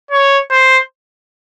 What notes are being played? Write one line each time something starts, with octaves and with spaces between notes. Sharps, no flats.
C#5
C5